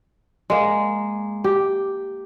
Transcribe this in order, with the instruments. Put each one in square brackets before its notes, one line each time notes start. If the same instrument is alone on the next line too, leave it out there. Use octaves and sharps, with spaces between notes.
[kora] G#3 A#3
G4